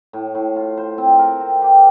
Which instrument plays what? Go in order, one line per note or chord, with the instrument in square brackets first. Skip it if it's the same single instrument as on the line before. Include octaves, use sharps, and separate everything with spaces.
[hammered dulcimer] A2
A2
F4
C5
C4
A#4
C4
G4